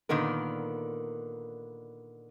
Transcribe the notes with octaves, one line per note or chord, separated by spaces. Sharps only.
A#2 D3 D#3 B3 A#4